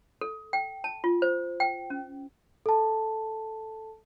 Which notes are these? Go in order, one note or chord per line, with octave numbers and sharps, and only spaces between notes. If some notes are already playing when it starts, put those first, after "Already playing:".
A4
G5
A5
F4
C5
G5
C#4
A4 A5